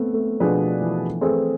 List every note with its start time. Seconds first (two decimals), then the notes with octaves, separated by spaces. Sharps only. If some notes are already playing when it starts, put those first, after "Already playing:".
Already playing: A3 B3 C4
0.14 A3
0.40 B2 F3 B3 D4 G#4 B4
0.81 E3
1.21 A3 C4 G#4 B4